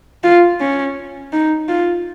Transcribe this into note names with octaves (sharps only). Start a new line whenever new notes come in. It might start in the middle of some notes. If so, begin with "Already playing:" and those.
F4
C#4
D#4
F4